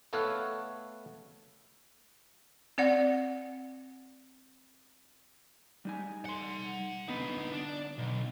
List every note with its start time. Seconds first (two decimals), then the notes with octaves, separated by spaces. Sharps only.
0.13 A3 B3 A4 C#5 F5 F#5
2.78 C4 D5 F#5
5.85 G3 D#4 G#5
6.26 F#5 C6
7.08 D3 B3 D#4 B4
7.53 D4
7.98 B1